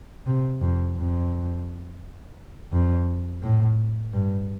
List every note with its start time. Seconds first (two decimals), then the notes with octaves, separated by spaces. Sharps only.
0.27 C3
0.62 F2
0.97 F2
2.72 F2
3.43 A2
4.13 G2